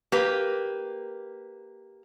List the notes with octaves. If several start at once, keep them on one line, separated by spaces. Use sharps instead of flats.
A#3 G4 B4